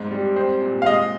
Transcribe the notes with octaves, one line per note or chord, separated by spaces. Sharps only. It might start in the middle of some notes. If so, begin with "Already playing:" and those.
Already playing: G#2 C4
G3
C4
A#2
F5
G#3 D#5